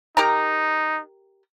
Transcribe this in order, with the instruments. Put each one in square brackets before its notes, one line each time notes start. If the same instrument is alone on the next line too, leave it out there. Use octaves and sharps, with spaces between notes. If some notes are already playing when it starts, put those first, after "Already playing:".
[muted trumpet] D#4 [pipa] G4 A#4 A#5